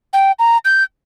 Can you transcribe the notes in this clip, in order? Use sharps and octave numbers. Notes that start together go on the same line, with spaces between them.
G5
A#5
G6